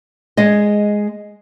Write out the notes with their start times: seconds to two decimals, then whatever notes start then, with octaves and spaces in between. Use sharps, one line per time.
0.37 G#3 G#4 D#5